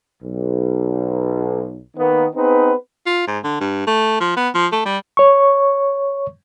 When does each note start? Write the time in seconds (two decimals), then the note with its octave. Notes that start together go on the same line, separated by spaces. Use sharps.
0.23 B1
1.97 D#3 A#3 B3
2.35 B3 C4 D#4 G#4 B4
3.06 F4
3.27 G#2
3.44 D3
3.60 G2
3.87 A3
4.20 F3
4.36 B3
4.54 F3
4.72 A3
4.85 G3
5.17 C#5 C#6